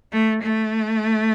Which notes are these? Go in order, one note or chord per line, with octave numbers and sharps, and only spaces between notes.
A3
A3